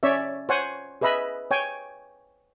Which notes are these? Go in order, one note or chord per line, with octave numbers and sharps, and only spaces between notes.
C#4 C#5 D5 E5
C5 C#5 F#5 G#5
G#4 B4 D#5 E5 B5
C#5 G5 G#5